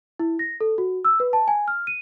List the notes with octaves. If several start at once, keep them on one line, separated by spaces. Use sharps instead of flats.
E4
A#6
A4
F#4
E6
B4
A5
G#5
F6
D#7